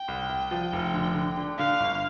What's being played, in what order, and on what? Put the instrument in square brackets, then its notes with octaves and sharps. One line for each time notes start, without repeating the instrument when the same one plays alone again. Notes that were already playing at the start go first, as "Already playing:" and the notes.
Already playing: [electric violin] G5
[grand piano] C2
C2
F3
F1
D3
D3
D3
[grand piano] D3 [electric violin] F5
[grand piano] G1